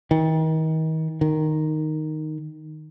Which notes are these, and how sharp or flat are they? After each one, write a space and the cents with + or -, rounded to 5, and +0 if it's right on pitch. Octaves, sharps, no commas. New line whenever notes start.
D#3 +35
D#3 -5